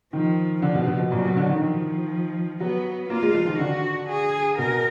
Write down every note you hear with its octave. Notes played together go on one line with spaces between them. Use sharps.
D#3 F3
D3 F3
B2
B2
B2
A#2 F#3
B2
D3
D#3
F3
F#3 B3
A#3 F4
G#3
F3
D#3
D3 F#4
G#4
B2 A#4